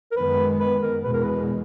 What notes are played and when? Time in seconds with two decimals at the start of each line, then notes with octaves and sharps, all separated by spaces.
0.12 A#4
0.16 F#2 D#3 G#3 B3 B4
0.60 B4
0.82 A#4
1.03 E2 B2 G#3 B4
1.13 A#4
1.23 B4